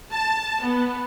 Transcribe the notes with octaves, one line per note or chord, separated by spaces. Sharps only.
A5
B3